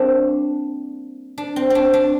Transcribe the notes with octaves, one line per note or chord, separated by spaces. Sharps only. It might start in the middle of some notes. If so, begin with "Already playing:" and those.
Already playing: G3 A#3 C4 D4
D4
C4
C4 D4
D4